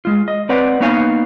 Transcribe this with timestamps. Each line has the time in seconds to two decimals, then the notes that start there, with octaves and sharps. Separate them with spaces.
0.05 G#3 F4
0.28 D#5
0.49 C4 B4 C#5 D5 F#5
0.80 A#3 B3 D#4 C#5 F5 G#5